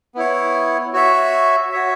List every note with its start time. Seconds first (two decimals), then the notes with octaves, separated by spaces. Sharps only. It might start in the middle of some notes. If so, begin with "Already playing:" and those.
0.15 B3 E4 C#5
0.93 F#4 C#5 E5
1.71 F#4 C#5 E5